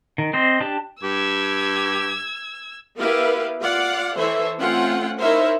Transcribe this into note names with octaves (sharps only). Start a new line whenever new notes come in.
D#3
C4 C5 D#5
D4 G4 A5
G2 G4 E6 G#6
B3 E4 G4 A#4 B4 F5
F4 D5 F5 F#5
E3 A4 C5 C#5 E5
A3 C4 C#4 F4 F#5 G5
D#4 E4 A#4 C5 C#5 E5